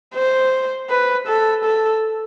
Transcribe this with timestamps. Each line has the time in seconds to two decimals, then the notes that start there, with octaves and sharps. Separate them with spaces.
0.15 C5
0.90 B4
1.28 A4
1.65 A4